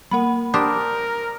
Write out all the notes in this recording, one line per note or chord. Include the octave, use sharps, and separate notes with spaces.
G3 A#3 A#4 F#5 B5
D4 G4 A#4 C5 D#6 G6